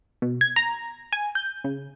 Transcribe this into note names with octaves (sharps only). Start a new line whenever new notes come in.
B2
G#6
A#5
G#5
G6
C#3